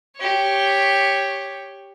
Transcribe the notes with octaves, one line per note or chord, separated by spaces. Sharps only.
G4 C#5